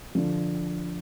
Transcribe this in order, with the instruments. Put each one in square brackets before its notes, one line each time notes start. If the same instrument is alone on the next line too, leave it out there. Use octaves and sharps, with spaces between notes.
[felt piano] D3 F3